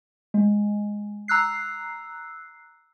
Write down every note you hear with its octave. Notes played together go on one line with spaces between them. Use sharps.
G#3
A#5 E6 F#6 C7